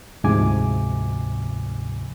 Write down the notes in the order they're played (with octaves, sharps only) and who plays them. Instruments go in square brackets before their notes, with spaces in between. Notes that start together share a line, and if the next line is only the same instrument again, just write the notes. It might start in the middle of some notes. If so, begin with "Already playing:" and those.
[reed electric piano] D2 G#2 C3 F3 G#5 D6